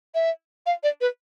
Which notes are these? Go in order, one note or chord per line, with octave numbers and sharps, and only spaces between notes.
E5
F5
D5
B4